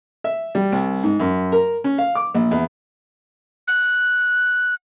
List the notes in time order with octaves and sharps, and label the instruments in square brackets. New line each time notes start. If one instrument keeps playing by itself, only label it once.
[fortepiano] E5
G3
C2
G#2
F#2
A#4
C#4
F5
D6
A#1
E2
[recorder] F#6